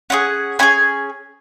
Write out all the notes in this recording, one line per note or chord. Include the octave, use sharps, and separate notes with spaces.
C#4 E4 G#4 F#5
C#4 E4 G#4 G#5